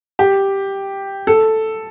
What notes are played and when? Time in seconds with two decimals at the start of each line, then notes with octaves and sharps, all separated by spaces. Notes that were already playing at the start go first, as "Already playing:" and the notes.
0.19 G4
1.27 A4